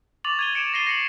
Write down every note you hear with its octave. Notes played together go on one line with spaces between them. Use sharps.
C#6 D6 A6 F7 F#7
G#6 D#7 G7
G#6 C#7 D7 E7
A6 A#6 C7 D#7 G7
A#6 C7 C#7 D#7 F#7